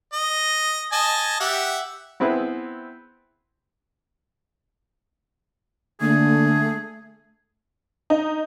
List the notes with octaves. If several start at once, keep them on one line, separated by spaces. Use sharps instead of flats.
D#5
D#5 G#5 A5
G4 E5 F#5
B3 C4 E4 G#4 B4
D3 A3 A#3 G#4
D#4